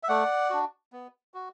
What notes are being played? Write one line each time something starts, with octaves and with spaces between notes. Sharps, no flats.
E5
A3 D5 F#5
D4 F#4
B3
F#4